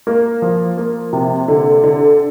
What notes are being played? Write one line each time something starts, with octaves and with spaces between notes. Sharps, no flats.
A#3
F3
A#3
C3
D3
D3